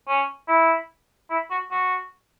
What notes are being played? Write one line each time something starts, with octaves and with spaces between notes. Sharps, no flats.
C#4
E4
E4
F#4
F#4